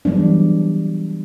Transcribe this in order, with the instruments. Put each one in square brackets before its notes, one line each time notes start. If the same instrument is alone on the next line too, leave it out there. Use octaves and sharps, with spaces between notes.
[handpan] E3 F#3 G3 B3 D4